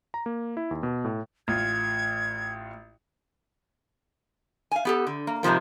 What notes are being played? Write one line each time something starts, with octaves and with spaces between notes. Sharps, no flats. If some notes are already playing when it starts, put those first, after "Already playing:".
A#5
A#3
E4
D#2
B2
A2
A1 F4 G#6
F5 G#5
B3 G4 A4
D3
A#3
F2 G#2 C3 F3 A#3